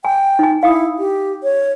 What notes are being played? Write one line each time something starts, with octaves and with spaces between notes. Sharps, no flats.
G5 G#5
D#4 G#5
E4 F5 G5 D#6
G4
C#5